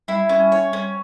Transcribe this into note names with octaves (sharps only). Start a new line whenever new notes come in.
G3 E4
C#4
C#5
C#4